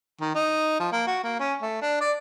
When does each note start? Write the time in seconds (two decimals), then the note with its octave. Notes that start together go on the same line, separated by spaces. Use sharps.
0.21 D#3
0.35 D#4
0.80 F3
0.92 A#3
1.07 F#4
1.24 A#3
1.40 C#4
1.62 A3
1.82 D4
2.01 D5